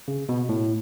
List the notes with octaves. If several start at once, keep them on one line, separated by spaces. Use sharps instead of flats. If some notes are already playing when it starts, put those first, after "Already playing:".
C#3
B2
A2